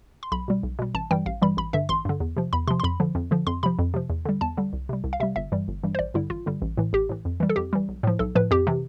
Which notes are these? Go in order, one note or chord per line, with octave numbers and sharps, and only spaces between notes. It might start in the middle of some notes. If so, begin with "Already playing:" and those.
C6
B1 B5
B2 G3
B1
B2 G3
A1 A5
G2 E3 G3 G5
A1 F5
G2 E3 G3 B5
A1 B5
G2 D3 E5
A1 C6
G2 D3
E2
C3 F3
E2 B5
C3 F3 C6
C6
F2 B5
D3 F3
F2
D3 F3
F2 C6
C3 F3 B5
F2
C3 F3
E2
D3 G3
E2 A5
D3 G3
C2
C3 G3
C2
F5
C3 G3 E5
G1 E5
G2 E3 G3
G1
G2 E3 G3
C5
A1 D5
G2 D3 G3 E4
A1 F4
G2 D3 G3
A1
A2 E3
A1 G4
A2 E3
F2
E3 G3
A4
F2 G4
E3 G3
B1
A2 F3
B1 A4
A2 F3 B4
F2 G4
C3 E3